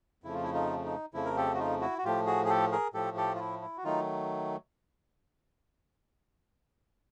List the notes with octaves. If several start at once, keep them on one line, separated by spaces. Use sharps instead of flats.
F2 C#3 F3 A3 E4
F4
E4
D#4 F4
D#4
F2 C#3 F3 A3 E4
A#4
G4 A4
F#4
D#4 F4
E4 F#4
F#4
A2 F3 A3 F4 G4
F#4 G#4
G#4
G4 A4
G#4 A#4
A2 F3 A3 G4 A4
G4 A4
F4
E4
E4
F#4
D#3 F#3 A3 D#4 F4